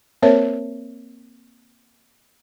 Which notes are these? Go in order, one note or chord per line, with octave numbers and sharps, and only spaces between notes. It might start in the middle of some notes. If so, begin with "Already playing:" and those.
A#3 C4 A#4 C5 C#5 E5